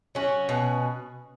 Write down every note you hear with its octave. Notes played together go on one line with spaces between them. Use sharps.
F#3 C#4 F#4
B2